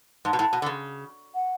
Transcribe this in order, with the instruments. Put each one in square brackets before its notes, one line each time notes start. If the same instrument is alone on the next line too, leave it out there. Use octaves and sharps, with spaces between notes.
[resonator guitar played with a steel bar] G#2 [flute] A5
[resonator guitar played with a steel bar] B2
A2
B2
D3
C#3
[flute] F#5